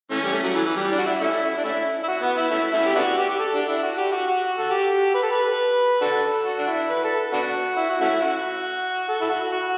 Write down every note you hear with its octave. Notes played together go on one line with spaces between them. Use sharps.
E3 A3 C#4
G3
A3
F#3
E3
E3
G3
D4
F#4
E4
A3 C#4 E4
D4
A3 C#4 E4
E4
F#4
B3
E4
A3 C#4 E4
A3 C#4 E4
G4
B3 D4 F#4
G4
G4
A4
D4
E4
F#4
G4
F#4
F#4
A4
G4
B4
A4
B4
D4 F#4 A4
F#4
D4
E4
B4
A4
B3 D4 F#4
E4
F#4
A3 C#4 E4
F#4
A4
E4
F#4
F#4